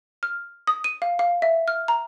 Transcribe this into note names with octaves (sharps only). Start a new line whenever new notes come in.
F6
D#6
D#7
F5
F5
E5
F6
A#5